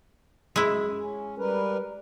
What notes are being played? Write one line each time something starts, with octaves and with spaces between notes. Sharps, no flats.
F#2 G#3 E4
C#4
G3 A#4 B4